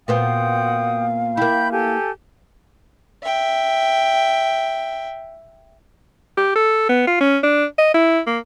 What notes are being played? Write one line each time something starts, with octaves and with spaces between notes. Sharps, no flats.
A#2 B3 C4 F#4 F5 G5 D#6
A#3 E4 G5 B5 G6
G4 A4 G#5
E5 G5
G4
A4
B3
F4
C#4
D4
D#5
E4
A#3